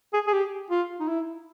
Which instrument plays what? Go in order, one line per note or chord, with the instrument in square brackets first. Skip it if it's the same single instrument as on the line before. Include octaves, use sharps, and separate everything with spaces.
[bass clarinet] G#4
G#4
G4
F4
D#4
E4